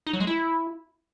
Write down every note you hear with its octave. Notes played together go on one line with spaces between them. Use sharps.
D#4
F#3
G#3
E4